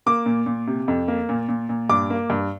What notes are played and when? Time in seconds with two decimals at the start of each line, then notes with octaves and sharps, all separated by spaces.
0.06 A#3 D6
0.26 A#2
0.46 A#2
0.67 C3
0.88 F2
1.08 A#3
1.29 A#2
1.49 A#2
1.69 A#2
1.90 G2 D6
2.10 A#3
2.30 G2